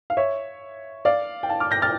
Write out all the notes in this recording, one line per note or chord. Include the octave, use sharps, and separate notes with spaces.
F5
C#5 E5
D5 F5
G5
F5 A5
D6 F6
G6 A#6
F6 A6